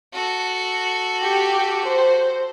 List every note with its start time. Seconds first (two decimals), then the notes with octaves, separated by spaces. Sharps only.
0.13 F#4 A4
1.21 G4
1.86 C5